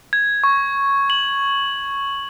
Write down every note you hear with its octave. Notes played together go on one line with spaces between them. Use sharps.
G#6
C#6
F#7